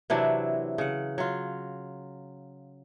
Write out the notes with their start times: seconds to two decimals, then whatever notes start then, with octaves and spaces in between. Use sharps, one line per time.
0.10 C3 E3 F#3 D4
0.78 C#3 F#5
1.18 F#3 F4